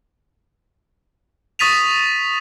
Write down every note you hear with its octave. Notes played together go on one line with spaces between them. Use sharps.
C#6 D#6 A6 B6 D#7 F7